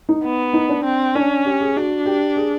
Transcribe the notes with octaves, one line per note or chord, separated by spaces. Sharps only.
D#4
B3
D#4
D4
C4
C#4 D4
G4
G#4
D4 F#4
G4
G#4